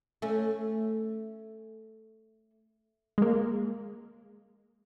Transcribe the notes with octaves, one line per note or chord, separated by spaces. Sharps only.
A3 C#4
G#3 A#3